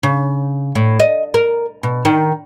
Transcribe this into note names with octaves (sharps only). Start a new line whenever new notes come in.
C#3
A2
D#5
A#4
B2
D#3